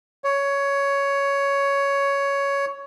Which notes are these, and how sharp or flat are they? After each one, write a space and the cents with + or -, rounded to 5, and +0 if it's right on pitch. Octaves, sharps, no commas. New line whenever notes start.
C#5 +10